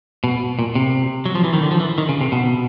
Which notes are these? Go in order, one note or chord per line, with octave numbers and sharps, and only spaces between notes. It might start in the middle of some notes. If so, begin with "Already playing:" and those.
B2
A#2
C3
F#3
F3
E3
D#3
D3
F3
E3
D#3
C#3
C3
B2